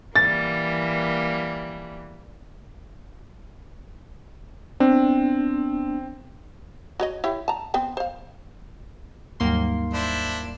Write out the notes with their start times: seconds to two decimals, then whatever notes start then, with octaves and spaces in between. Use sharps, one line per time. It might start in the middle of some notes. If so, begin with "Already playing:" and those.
0.16 E3 G3 A#3 A6
4.80 B3 C4 D4
7.00 F#4 C#5 D#5
7.24 E4 G4 C#5
7.48 A5 A#5
7.74 B3 C4 G5
7.97 C5 F5
9.40 D#2 G#2 F#3 G3 A#3 C6
9.94 D4 E4 C5